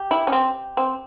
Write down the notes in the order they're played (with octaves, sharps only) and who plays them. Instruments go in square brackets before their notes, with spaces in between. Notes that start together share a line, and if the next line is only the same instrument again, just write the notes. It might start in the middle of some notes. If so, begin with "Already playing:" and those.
Already playing: [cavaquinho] G4
[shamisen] E4
C#4
C4
C4